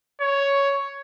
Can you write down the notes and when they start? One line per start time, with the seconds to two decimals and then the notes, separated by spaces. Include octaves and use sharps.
0.21 C#5